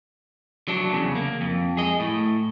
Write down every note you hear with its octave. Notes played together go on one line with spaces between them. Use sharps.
F#3 D4
E2 C#3
A#3
F2
G#4 D#5
A2